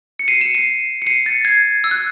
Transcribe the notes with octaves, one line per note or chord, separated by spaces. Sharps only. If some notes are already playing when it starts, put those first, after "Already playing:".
C#7
C7 D#7
C#7 E7
C7 D#7
C#7
C7 D#7
A6 C#7
G#6 C7
E6
F#6